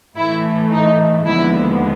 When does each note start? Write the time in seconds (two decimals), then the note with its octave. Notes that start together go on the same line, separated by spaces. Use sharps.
0.17 A2 E3 A3 E4
0.72 D#4
1.26 D#2 D3 F3 G#3 B3 E4